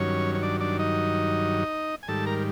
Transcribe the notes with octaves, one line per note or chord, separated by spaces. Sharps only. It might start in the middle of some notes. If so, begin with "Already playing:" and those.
Already playing: G2 D#3 F#3 C#4 C#5
C#5
D4 D5
D4 D5
D#4 D#5
G#5
G#2 D#3 G3 A4 A5
A#4 A#5